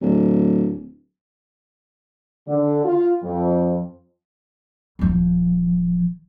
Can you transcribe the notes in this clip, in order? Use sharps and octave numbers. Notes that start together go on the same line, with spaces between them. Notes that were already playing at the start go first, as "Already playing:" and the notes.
D1
D3
F4
F2
D#1 F3